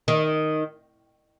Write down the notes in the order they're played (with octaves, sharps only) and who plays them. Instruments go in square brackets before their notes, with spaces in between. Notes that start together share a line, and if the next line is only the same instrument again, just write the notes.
[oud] D#3